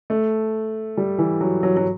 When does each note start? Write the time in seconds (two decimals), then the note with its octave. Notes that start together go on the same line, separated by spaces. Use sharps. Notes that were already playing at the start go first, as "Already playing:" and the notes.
0.10 A3
0.97 G3
1.18 E3
1.41 F#3
1.63 F#3
1.77 F#3